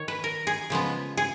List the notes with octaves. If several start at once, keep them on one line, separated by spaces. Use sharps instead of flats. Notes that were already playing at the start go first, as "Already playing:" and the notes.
Already playing: D#3 C#5
B4
A#4
G#4
C#3 F3 G#3 B3
G#4